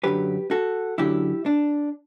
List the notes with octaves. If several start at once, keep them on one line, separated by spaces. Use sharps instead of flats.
F#2 D3 F#3 G4 B4
F#4 A4
F#2 D3 F#3 E4 G4
D4